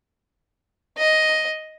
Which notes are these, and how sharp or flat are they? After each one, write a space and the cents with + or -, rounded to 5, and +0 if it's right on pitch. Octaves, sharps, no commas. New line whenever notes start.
D#5 +5